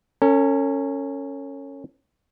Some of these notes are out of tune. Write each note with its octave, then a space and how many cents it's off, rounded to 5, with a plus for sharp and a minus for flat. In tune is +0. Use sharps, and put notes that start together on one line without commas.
C#4 -5 A4 +45